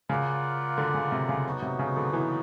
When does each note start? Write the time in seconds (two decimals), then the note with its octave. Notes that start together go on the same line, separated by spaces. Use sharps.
0.09 C#3 F4 A#4 D5 F#5
0.78 D3
0.94 C#3
1.12 C3
1.29 C#3
1.46 F#3 B3 D#4 F#4
1.62 C3
1.79 C#3
1.97 D3
2.13 E3